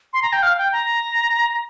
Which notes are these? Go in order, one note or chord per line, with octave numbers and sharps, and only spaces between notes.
C6
A#5
G5
F5
G5
A#5